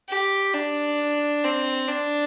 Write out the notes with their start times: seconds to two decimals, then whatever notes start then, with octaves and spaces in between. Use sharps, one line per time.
0.09 G4
0.54 D4
1.44 C4
1.88 D4